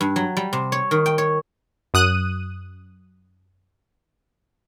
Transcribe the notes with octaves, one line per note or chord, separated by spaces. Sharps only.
G2
F#3
G3
C3
C#5
D#3
G5
C#5
F#2 D#6 F#6 D#7